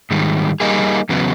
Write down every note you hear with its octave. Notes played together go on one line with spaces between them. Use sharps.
G#2 D#3 G3
G3 A#3 D#4 G#4
E2 C#3 F#3 B3